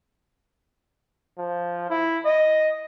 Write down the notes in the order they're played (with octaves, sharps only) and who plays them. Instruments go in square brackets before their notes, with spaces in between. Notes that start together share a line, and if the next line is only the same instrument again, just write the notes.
[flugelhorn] F3
E4
D#5